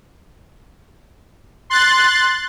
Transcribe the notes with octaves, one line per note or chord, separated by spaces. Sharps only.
C6 F#6 A6